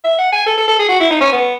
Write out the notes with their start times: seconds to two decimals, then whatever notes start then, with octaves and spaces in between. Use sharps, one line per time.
0.04 E5
0.19 F#5
0.32 G#5
0.46 A4
0.57 A4
0.67 A4
0.79 G#4
0.89 F#4
1.00 E4
1.11 D#4
1.20 C#4
1.32 B3